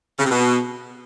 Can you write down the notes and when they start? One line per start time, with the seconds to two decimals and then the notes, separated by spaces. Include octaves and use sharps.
0.18 C#3
0.25 C3
0.31 B2